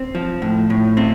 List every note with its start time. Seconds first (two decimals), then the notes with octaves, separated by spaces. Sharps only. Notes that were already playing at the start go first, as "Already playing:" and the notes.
Already playing: C4
0.15 F3
0.42 A2
0.70 A2
0.97 C4